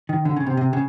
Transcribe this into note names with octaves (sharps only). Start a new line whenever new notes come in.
D#3
D3
C#3
C3
C3
C#3